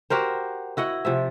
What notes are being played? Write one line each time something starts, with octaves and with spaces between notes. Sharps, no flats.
F#4 G4 A#4 C5
E4 F#4 D#5 F#5
C3 F3 E5